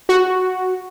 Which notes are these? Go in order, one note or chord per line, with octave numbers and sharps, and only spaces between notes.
F#4